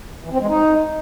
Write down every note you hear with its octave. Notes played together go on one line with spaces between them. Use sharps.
E3
C4
G#3
D#4